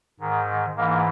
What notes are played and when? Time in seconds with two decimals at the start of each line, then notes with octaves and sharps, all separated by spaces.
0.20 G#2 D#3
0.76 G#2 E3 A#3